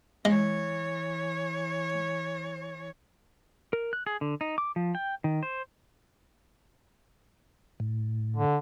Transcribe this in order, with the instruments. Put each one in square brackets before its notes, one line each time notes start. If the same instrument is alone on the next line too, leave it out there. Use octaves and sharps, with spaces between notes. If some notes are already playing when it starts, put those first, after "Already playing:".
[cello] E3 C#5 [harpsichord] G#3
[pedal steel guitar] A#4
F#6
G#4
D3
D#4
D6
F3
G5
D#3
C5
[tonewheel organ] A2
[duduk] D3